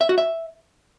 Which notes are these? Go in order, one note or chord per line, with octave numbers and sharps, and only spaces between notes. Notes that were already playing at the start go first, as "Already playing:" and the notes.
E5
F#4
E5